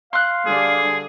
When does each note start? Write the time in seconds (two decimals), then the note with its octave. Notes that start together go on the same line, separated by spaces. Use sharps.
0.13 F5 C6 F#6
0.46 D3 G3 G#4 D5